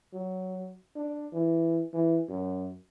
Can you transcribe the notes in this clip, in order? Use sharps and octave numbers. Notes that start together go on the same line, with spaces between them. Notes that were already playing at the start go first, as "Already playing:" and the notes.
F#3
D4
E3
E3
F#2